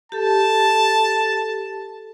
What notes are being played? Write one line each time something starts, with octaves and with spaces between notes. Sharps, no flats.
G4 A4 A5